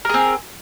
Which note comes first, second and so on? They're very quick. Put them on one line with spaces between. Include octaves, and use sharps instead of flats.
A#4 G#4 C4